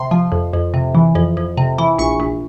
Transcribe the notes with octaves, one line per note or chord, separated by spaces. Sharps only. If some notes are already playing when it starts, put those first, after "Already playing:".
Already playing: C3 C6
F3
F2
F2
C3
E3
F2
F2
C3
E3
A#1 C#6
A#1